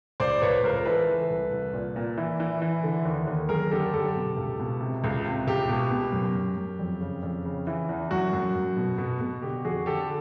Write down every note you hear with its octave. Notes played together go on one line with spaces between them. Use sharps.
C#2 C5 D5
C#2 B4 C#5
C#2 A#4 C5
E3 A4 B4
E3
C2
C2
A#2
A#2
E3
E3
E3
D3
D#2
D#2
F#2 G#4 A#4
D3 G4 A4
F#2 G4 A4
B2
C#2
B2
C3
C#2
C3
C#2 G4
B2
B2
F#2
F#2
F#2
F2
C#3
F2
C#3
E3
E2
F#2 F#4
F#2
F#2
B2
B2
B2
D3 G4
F2 F#4 G#4
D3 G4 A4